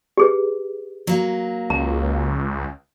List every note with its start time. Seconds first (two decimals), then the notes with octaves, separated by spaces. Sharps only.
0.17 G4 G#4 B4
1.07 F#3 A#3
1.70 C#2 A#5